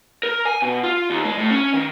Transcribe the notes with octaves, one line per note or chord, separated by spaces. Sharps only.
A#4
G#5
B2
F4
D#2
G#3
A2
C#4
D#3